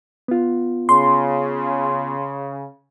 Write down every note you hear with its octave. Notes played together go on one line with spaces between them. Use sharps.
B3 F4
C#3 C6